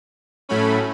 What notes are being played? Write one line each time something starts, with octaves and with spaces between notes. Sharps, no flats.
A2 F#3 A3 C#4 B5